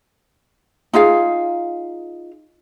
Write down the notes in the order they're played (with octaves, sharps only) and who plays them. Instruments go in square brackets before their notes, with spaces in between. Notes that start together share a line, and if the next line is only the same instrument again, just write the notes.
[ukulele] D#4 F4 G#4 F5